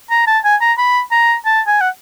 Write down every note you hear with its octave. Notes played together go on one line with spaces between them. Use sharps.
A#5
A5
G#5
A#5
B5
A#5
A5
G#5
F#5